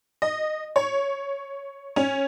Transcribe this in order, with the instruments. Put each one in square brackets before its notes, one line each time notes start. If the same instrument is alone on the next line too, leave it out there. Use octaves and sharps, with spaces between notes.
[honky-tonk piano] D#5
C#5
C#4